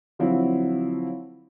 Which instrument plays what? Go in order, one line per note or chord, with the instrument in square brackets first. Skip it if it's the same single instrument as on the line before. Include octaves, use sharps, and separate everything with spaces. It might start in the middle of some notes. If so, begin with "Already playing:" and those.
[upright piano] D3 F3 F#3 C4 E4